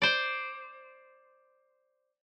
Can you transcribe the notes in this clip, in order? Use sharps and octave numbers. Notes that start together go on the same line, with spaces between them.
C5 D5